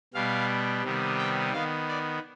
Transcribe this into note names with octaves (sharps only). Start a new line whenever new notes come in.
B2 G3 B3 F5
C3 D#3 G3 B3
G5
D#3 B3 F5
D5